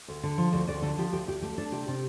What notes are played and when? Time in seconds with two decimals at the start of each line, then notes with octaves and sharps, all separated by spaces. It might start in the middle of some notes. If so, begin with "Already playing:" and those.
0.08 D2
0.23 D3
0.38 F3
0.53 D2 A4
0.67 D2 D5
0.82 D3 A4
0.98 F3 G4
1.12 D2 G4
1.27 D2 G4
1.42 A3 G4
1.58 D4 A4
1.72 C3 G4
1.88 C3